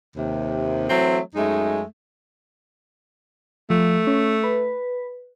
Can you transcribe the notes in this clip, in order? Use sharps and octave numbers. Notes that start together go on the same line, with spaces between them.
D#2 C3
E3 F#3 A3 C4
F#2 G#3 A3 D#4
F3 A3
C#4
B4